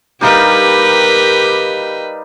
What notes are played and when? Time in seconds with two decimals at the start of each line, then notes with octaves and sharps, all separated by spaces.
0.21 G3 D#4 G4 A#4 B4 F5